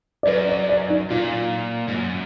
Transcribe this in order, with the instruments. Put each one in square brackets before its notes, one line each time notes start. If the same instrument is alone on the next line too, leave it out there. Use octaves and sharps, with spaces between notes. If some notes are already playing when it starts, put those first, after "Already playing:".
[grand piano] D5
[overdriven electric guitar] F#2 [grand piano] B4
[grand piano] D5
D5
D#4
[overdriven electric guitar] A#2 [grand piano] F4
[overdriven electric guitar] G#2
F#2